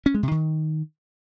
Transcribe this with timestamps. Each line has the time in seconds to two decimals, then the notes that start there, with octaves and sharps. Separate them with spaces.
0.06 C#4
0.14 G#3
0.23 C3
0.31 D#3